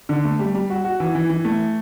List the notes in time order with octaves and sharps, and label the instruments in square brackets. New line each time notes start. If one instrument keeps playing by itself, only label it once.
[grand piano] D3
A3
G3
G3
F#4
F#4
E3
E3
E3
A3